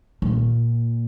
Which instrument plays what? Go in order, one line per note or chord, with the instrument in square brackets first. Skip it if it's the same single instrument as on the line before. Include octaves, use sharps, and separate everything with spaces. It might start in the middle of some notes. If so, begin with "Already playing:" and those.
[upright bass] A#2